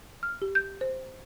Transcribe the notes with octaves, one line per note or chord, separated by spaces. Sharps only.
F6
G4
G6
C5